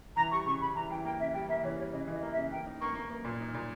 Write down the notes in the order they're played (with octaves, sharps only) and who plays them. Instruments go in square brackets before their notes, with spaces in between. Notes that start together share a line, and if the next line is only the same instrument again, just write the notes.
[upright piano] E3 [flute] A#5
[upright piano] G3 [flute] C#6
[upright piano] C#3 [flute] C#6
[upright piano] C#3 [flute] B5
[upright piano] E3 [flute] A#5
[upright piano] E3 [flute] G5
[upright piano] A#3 [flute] G5
[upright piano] C#3 [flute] E5
[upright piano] G3 [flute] G5
[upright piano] A#3 [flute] E5
[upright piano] E3 [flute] C#5
[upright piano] G3 [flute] C#5
[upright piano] C#3 [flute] D#5
[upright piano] E3 [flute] D#5
[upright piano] A#3
[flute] E5
[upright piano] C#3
[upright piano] A#3 [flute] G5
[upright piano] D#4
[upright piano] A#3 [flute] C#6
[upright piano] A#3
A#3
A#2
D#4
A#2